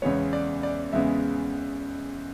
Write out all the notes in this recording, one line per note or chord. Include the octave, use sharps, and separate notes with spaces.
E2 C#3 G#3 B3 C#5
D5
D5
E2 C#3 G#3 B3 E5